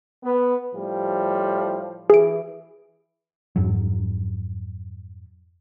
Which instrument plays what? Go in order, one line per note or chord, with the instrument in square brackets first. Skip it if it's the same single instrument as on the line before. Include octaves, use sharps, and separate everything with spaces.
[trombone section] B3
A2 F3 G3
[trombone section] E3 [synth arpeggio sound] G#4 D7
[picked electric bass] F2 G#2 F#3